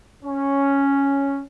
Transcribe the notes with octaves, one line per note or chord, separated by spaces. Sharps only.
C#4